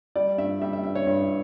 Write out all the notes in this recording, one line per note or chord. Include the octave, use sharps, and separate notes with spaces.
G3 D5
G2 E5
G3 E5
E5
G2 E5
C#5
G2